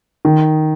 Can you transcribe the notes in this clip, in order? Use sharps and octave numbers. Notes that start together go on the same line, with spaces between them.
D#3